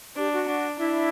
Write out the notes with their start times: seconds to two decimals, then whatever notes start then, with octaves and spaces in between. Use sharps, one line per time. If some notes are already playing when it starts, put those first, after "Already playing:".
0.16 D4 G4
0.32 F#4
0.47 D4
0.79 D4 E4